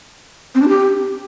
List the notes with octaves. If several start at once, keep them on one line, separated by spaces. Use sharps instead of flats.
C4
D4
G4